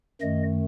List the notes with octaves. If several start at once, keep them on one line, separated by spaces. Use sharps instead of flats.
F#2 D#3 A3 D#5